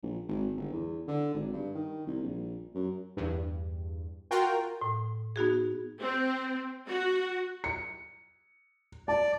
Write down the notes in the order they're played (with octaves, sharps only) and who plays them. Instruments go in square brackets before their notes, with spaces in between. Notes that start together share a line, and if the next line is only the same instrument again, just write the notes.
[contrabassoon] A#1
G#1
G1
E2
D3
G#1
G2
D#3
C2
A#1
F#2
[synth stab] E2 G2
F4 F#4 A#4 G5
[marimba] A2
B3 D#4 F#4 G#4
[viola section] C4
F#4
[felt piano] C#7
[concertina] D5 [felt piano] A5